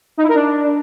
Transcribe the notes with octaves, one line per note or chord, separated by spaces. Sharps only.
D#4
E4
A#4
D4